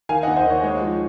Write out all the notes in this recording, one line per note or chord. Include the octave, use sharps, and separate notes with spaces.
D#3 F5 G#5
D#5 F#5
D#2
C5 D#5
D#3 C#5
G#3 C#5
F3